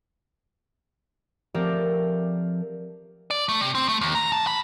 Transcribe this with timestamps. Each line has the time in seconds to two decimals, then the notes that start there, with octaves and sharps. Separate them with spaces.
1.54 F3 A3 C4 G4 A#4 D5
3.31 D5
3.49 A3
3.61 C3
3.75 C4
3.88 A3
4.01 D#2
4.15 A#5
4.32 A5
4.47 B5